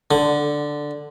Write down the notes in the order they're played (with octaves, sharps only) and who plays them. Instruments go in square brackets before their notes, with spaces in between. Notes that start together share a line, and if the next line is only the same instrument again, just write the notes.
[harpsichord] D3